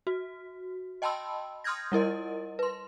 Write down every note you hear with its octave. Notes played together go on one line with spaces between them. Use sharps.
F#4
D#5 G5 A5 B5 C6 E6
C6 D#6 F6 G6 G#6 A#6
G3 E4 A#4 D#5
B4 C6